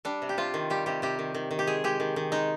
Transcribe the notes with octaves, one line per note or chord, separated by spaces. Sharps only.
G3 D4
C3
G4
C3 F4
D#3
G3 G4
C3 G4
C3 G4
D#3
D#3
D#3
G4
G#3 G#4
G#3 G4
D#3
D#3
G#3 D#4